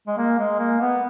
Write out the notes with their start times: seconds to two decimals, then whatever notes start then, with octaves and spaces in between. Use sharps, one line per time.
0.07 G#3
0.17 A#3
0.39 G#3
0.59 A#3
0.81 B3